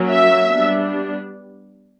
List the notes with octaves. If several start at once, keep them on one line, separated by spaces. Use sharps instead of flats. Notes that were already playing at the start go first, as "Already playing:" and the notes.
Already playing: F#3 A#3 C#4
E5
G3 B3 D4